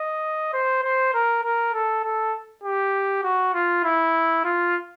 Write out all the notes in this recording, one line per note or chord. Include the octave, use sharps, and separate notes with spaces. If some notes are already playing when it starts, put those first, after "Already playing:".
Already playing: D#5
C5
C5
A#4
A#4
A4
A4
G4
F#4
F4
E4
F4